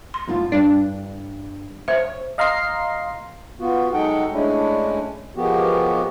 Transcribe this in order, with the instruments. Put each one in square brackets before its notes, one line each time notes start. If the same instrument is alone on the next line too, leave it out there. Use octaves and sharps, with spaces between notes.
[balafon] C6
[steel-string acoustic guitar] F#2 A2 F4
[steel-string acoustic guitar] G2 [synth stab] D4
[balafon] C5 E5 [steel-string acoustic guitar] C#5
[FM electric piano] D#5 F5 A#5 C6 C7
[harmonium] B3 F4 F#4
F#3 G#3 D#4 A4 F#5 G5
G#3 A3 C#4 D4 E4
F3 G#3 A#3 B3 F#4 G4